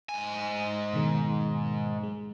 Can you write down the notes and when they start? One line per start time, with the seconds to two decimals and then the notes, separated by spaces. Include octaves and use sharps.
0.09 G#2 G#5
0.93 B2 D#3 G#3
2.03 G#3